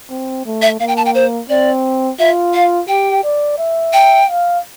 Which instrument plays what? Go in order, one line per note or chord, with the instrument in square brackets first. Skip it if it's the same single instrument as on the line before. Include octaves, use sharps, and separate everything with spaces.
[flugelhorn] C4
A3
[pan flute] E5
[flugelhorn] A#3 [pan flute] F5
[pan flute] G5
A5
G5
C5
[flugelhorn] C4 [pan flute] D5
[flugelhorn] F4 [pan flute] E5
[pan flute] F5
[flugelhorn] G4 [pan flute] G5
[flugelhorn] D5
E5
[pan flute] G5
[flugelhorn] F5